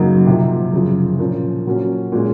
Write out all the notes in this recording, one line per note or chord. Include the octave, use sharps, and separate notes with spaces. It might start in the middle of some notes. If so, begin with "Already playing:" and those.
Already playing: F#2 C#3 F#3 A#3 D#4
C3 F3 A#3
F#2 C#3 F3
A#2 F3 A#3 C#4
A#2 F#3 A#3 C#4
A#2 G#3 C#4